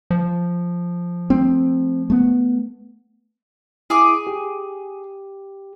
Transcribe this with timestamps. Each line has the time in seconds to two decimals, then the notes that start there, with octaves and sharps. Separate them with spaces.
0.10 F3
1.30 A3 A#3 C4
2.10 A3 B3
3.90 E4 G#4 D6
4.27 G4